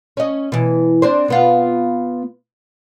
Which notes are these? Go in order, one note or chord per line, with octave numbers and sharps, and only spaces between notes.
C#4 D#5
B2 E3
C4 D4 C5
B2 B3 F4